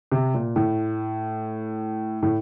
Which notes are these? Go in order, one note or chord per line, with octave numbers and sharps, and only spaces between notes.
C3
A#2
A2
A2